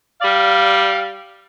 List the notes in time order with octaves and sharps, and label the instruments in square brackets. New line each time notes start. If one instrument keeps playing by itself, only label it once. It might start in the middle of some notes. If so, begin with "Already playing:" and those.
[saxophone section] G3 D5 F5